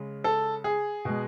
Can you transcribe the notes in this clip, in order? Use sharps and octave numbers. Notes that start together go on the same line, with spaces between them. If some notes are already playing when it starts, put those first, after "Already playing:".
Already playing: C#3 G#3
A4
G#4
B2 G#3